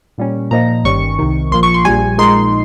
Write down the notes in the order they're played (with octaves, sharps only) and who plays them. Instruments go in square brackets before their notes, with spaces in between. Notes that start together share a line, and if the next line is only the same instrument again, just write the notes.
[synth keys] A#2 G3 C#4
A#2 F3 A#3 D#4 A#5
G1 G2 D#3 G3 C#4 C#6
C2 C3 D#3
A#1 A#2 F3 C6
C#6
C6
A#1 A#2 G3 G#5
A#1 A#2 G#3 D#4 C6